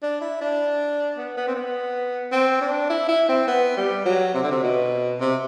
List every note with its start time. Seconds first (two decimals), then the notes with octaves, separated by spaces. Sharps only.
0.03 D4
0.21 E4
0.41 D4
1.17 B3
1.37 B3
1.48 C4
1.55 B3
2.32 C4
2.61 D4
2.90 E4
3.09 E4
3.29 C4
3.48 B3
3.77 G3
4.06 F#3
4.34 C3
4.43 D3
4.51 C3
4.63 B2
5.20 C3